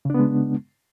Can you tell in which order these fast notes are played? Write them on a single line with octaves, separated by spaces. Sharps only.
C#3 D4 B3 G#3